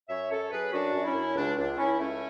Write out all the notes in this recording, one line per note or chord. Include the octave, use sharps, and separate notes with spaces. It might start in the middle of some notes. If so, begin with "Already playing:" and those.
F#2 C#5 E5
F#2 A4 C#5
F#2 G#4 B4
F#2 D4 F#4
F#2
C#4 E4
F#2
C#2 D4
C#2 D4
C#2 C#4 E4
A3 C#4 E4